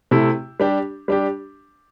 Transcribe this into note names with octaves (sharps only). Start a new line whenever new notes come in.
C3 A3 E4
G3 D4 G4
G3 D4 G4